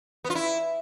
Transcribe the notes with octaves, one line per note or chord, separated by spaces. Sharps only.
B3
F4
E4